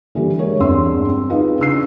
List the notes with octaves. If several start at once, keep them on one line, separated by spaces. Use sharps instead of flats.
D3 E3 G3 A#3 G4
G#3 A#4 C#5
G1 E2 C4 D4 C6 E6
C4
D#4 F4 G#4 B4 D#5 F5
C#3 D4 E6 C7